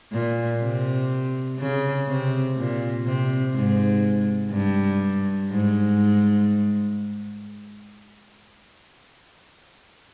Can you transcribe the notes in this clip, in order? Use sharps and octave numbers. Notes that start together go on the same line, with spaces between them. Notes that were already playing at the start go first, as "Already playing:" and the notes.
A#2
C3
C#3
C3
A#2
C3
G#2
G2
G#2